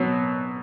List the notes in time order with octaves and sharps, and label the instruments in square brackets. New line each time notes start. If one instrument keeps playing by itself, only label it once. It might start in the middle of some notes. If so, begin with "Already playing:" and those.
Already playing: [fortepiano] B2 F#3